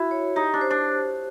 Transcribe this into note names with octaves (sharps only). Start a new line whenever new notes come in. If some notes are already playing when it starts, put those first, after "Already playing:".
Already playing: E4 F#4
C#5
D#4 G4
D4
C5
D4